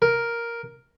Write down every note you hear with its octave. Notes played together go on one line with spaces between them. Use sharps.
A#4